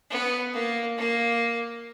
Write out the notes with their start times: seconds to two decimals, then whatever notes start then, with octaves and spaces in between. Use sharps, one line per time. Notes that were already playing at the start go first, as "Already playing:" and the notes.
0.10 B3
0.53 A#3
0.97 A#3